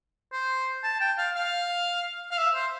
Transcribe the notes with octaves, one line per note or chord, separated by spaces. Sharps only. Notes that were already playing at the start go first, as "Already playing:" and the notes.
C5
A5
G5
F5
F5
F5
E5
C5